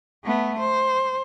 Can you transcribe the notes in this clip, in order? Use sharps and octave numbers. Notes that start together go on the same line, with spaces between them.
A3 B3
C5